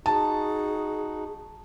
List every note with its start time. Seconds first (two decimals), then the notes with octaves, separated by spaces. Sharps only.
0.06 D#4 F#4 G#4 A5